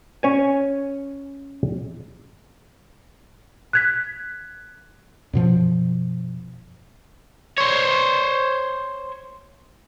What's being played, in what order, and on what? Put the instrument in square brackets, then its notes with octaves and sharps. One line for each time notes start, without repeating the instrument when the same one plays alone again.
[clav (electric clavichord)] C#4 C#5 G#5
[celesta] F#6 G#6 B6
[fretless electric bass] F#2 B2 F3
[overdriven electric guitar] C5 C#5